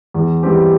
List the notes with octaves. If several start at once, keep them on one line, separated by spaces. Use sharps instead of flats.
E2
E3 G3 C4 G4